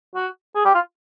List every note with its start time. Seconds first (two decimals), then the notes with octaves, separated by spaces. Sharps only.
0.15 F#4
0.55 G#4
0.65 G4
0.74 F4